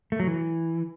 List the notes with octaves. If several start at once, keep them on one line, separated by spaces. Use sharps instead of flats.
A3
F#3
E3